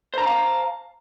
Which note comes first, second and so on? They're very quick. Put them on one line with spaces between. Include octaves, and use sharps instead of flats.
C5 A#5 A5 F5